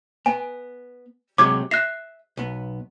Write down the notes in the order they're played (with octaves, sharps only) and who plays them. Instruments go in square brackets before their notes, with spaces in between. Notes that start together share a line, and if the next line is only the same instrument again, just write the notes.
[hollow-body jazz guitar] B3 [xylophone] G#5
[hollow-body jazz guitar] C3 F#3 G#3 [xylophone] D6 G#6
[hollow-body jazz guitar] E5 [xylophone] F#6 A#6 C7
[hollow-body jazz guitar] B1 B3